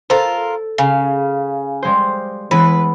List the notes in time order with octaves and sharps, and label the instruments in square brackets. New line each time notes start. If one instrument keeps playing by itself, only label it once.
[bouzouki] F4 A#4 [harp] A4 [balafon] C5
[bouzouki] C#3 [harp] F5
[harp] G3 G#3 C5
[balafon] E3 [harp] G#3 B3 E4 [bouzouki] B4